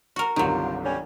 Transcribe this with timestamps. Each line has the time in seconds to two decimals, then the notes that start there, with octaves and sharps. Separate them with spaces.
0.16 F#4 A#4
0.36 G1 C2 D3 D#3 F#3 F4 G4
0.83 G3 C#4